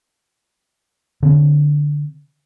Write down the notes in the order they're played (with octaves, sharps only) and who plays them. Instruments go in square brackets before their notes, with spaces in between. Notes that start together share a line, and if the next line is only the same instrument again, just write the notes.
[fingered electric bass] D3 C4